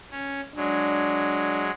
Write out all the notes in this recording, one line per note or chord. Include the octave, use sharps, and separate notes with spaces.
C#4
F#3 G#3 D4